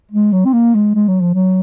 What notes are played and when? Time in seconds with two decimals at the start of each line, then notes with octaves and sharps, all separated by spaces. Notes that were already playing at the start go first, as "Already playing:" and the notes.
0.12 G#3
0.33 F#3
0.45 C4
0.53 A#3
0.75 G#3
0.95 G#3
1.08 F#3
1.21 F3
1.34 F#3